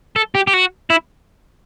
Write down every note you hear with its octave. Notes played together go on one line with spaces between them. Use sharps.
A4
G4
G4
F#4
E4